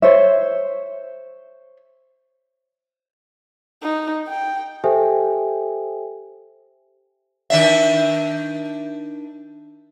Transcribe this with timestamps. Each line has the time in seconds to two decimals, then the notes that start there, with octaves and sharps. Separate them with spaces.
0.02 C5 C#5 E5
3.82 D#4
4.28 G5
4.84 G4 A4 C5 E5 G5 G#5
7.50 D#3 D4 E5